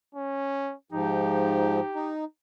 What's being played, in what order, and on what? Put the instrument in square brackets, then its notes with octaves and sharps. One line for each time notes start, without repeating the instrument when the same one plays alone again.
[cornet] C#4
[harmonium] G#2 F3 [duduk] D#4 [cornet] G4
[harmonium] D#4